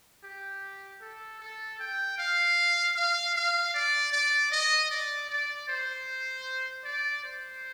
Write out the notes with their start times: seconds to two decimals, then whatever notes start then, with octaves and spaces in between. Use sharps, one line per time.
0.24 G4
1.01 A4
1.41 A4
1.79 G5
2.18 F5
2.96 F5
3.35 F5
3.74 D5
4.12 D5
4.52 D#5
4.91 D5
5.29 D5
5.68 C5
6.84 D5
7.24 C5